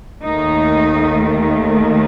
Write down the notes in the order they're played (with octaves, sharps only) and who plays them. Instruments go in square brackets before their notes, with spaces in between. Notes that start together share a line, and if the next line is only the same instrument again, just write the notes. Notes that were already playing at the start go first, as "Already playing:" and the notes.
[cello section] D#2 D#3 A3 D#4